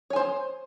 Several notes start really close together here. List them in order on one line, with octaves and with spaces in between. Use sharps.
C#5 G#5 C5